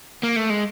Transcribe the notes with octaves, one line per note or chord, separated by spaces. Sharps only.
A#3
A3
G#3